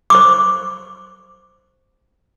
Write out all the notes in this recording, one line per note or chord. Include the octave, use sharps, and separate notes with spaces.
C5 C#6 D6